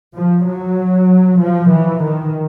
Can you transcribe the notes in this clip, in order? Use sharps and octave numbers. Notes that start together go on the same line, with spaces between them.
F3
F#3
F3
E3
D#3